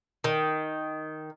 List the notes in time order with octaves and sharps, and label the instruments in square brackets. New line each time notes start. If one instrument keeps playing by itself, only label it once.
[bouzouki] D#3